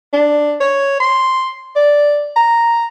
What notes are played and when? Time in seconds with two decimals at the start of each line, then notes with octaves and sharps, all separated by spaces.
0.13 D4
0.60 C#5
1.00 C6
1.76 D5
2.36 A#5